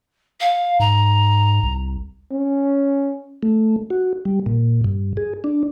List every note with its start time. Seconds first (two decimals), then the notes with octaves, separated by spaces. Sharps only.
0.40 F5
0.80 G#2 A#5
1.63 C2
2.32 C#4
3.43 A3
3.90 F#4
4.25 G3
4.46 A#2
4.84 G2
5.17 G#4
5.44 D4